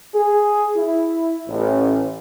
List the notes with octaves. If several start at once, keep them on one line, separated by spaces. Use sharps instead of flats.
G#4
E4
A1